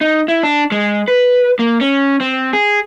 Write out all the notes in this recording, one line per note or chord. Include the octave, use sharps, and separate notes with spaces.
D#4
E4
D4
G#3
B4
A#3
C#4
C4
G#4